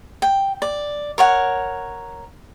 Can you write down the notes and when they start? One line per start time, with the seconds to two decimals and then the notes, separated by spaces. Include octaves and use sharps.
0.22 G5
0.62 D5
1.18 A#4 C#5 F#5